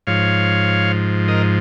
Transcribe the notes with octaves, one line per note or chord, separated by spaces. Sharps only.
G#2 F3 C#5 F5
A#4 D#5